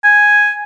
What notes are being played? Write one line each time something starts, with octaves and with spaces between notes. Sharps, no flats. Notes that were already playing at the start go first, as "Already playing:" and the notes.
G#5